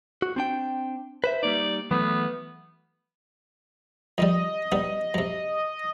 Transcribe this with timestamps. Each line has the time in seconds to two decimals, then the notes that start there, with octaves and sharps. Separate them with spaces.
0.22 F#4
0.36 C4 D4 G5
1.24 B4 C5 E5
1.43 G3 A#3 D#4 D5
1.91 E3 F#3 A3 B3
4.18 F2 D#3 G3 D#5
4.72 G3 B3 D#4
5.14 F#2 C3